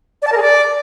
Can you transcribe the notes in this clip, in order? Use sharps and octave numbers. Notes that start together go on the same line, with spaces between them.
D5
A5
A#4
G#4
D5